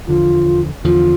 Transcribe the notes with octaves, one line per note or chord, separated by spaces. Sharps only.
E2 D3 F3 F4
E2 D3 F3 F4